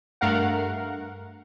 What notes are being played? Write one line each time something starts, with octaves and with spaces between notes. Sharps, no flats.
G2 A3 A#4 F5 F#5